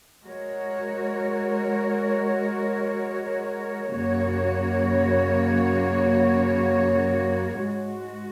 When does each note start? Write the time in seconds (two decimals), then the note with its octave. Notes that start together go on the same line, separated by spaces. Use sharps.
0.24 G#3 F#4 A#4 C#5
3.93 F#2 C#3 A#3 F#4 C#5
7.62 G#2 G#3 F#4